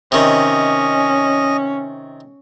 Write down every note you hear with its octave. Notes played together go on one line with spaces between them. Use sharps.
C3 D#3 C#4 D#5